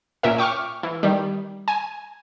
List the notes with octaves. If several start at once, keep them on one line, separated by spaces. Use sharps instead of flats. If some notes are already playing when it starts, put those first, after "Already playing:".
A#2 C#4 A#4 E5
G5 C#6 D6 F6
E3
D#3 G3
G#5